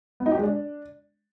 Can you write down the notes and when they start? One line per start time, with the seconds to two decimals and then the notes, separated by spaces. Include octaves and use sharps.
0.20 B3
0.26 D#4
0.32 G4
0.38 G#3
0.43 D4